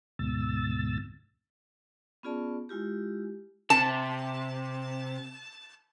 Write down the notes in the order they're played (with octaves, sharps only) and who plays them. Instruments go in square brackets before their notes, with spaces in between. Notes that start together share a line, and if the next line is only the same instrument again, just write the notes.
[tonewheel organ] D2 G#2 B2 E6 A6
[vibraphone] B3 C#4 F4 G#4 D5 A5
G#3 E4 F4 G4
[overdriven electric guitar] C3 [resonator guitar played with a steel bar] A5